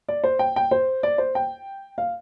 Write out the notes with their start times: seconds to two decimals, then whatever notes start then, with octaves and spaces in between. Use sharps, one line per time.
0.09 D5
0.24 C5
0.39 G5
0.56 G5
0.71 C5
1.03 D5
1.18 C5
1.35 G5
1.98 F5